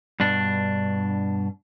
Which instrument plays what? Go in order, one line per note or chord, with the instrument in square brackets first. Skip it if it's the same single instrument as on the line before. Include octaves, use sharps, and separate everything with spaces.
[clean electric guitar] G2 B2 D4